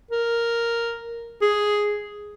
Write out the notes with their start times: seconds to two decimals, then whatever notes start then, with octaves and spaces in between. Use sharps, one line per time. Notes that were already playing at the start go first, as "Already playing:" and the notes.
0.11 A#4
1.42 G#4